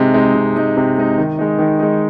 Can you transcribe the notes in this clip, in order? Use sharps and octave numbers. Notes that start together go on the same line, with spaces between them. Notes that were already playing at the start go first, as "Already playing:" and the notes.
Already playing: C3 G#3 D#4
G#3 D#4
C3
G#3 D#4
C3
G#3 D#4
D#3
G#3 D#4
D#3
G#3 D#4